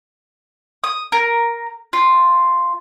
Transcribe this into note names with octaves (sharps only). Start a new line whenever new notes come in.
D#6
A#4
F4